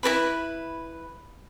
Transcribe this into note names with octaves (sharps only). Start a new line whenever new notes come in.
E4 A#4 B4 B5